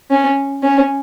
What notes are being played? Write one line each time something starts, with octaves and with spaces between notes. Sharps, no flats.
C#4
C#4